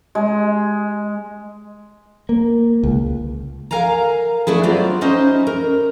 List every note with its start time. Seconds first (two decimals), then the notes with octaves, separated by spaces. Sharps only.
0.15 G#3
2.29 A#3
2.83 C#2
3.71 A#4 F5 G#5 A#5
4.47 A3 D4 E4 G#4
4.63 F#3 B3 C4 F4 D5
5.01 C#4 D#4 E4 C5 D#5
5.47 A#4